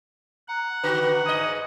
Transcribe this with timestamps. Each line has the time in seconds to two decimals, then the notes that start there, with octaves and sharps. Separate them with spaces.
0.48 F#5 A#5
0.83 D3 F#4 B4
1.26 G#2 D#5 D#6 G#6